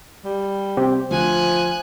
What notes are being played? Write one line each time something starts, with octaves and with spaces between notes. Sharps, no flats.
G3
C3 C4 G4
D2 F3 G#5 F#6